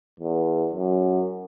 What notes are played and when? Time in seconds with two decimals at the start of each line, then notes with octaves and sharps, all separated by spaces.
0.20 E2
0.73 F#2